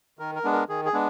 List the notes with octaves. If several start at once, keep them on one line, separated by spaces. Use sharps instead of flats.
D#3 A#4
A#4
G#3 B3 D4
A#4
D#3 G#4
G#4
G#3 B3 D4